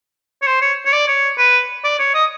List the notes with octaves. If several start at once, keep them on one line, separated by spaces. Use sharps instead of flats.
C#5
C5
C#5
C#5
D5
C#5
B4
D5
C#5
D#5